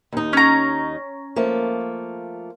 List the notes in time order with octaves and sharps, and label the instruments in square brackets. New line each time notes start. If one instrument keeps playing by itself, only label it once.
[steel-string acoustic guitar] D#2 D#4
[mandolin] C#4 A#5
[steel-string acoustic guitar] F3 A3 A#3